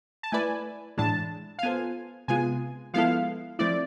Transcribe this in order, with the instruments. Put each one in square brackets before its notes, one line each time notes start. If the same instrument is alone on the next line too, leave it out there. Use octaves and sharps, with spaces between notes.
[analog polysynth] A5
[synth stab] A3 E4 B4 D5 [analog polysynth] G#5
[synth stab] A2 E3 G#3 D4 [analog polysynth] A5
[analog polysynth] F5
[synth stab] B3 F4 A4 C5 [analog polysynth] G#5
[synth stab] C3 G#3 B3 F4 [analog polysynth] G#5
[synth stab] F3 G#3 B3 E4 A4 [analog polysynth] F5
[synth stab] F3 A3 C4 E4 [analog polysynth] D5